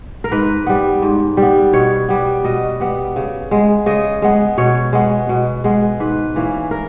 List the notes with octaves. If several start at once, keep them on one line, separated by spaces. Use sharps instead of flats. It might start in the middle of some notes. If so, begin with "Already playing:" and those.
A#4
G#2 B4
G3 B3
G#2
G3
B3
B2 C#5
G3 B3
B2 D#5
G3 B3
C#3
G#3 B3
C#3 D#5
G#3 B3
B2 C#5
G#3 B3
B2
G#3 B3
G#2 B4
E3 A#3 C#4
A#4